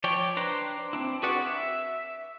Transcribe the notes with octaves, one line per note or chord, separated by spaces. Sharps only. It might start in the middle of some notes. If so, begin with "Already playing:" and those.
F3 C#5 D5 G5
D4 B4 C5 A#5
C4 D4 E4
F#4 G#4 B4 D5 F#5
E5